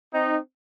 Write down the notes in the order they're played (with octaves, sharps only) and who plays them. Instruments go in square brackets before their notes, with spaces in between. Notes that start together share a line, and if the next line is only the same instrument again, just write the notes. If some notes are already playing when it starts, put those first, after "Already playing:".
[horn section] C4 D#4